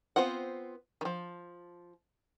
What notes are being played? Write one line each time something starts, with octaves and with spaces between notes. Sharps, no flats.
B3 C4 F4 C5 F#5
D#3 F3